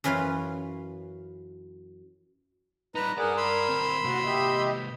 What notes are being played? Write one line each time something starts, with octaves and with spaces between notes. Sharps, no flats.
F#2 E3 C#4 F4 B4 F5
G3 D#4 B4 A#5
G2 G#4 A#4 D5 F#5
A#4 B5 C6 E6
D2 C4
C3 A#3 F#4
G4 D#5 E5